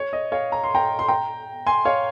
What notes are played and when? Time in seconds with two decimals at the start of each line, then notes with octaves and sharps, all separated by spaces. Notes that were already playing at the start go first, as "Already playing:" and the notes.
Already playing: C#5
0.13 D#5
0.32 C#5 F5
0.52 A#5
0.64 C6
0.75 G5 A#5
0.99 C6
1.08 G5 A#5
1.67 G#5 C6
1.85 C#5 F5